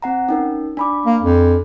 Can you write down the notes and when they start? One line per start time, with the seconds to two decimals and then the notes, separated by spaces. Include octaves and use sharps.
0.02 C4 F#5 A#5
0.29 C#4 D#4 A#4
0.77 D4 B5 D6
1.06 A#3
1.22 F2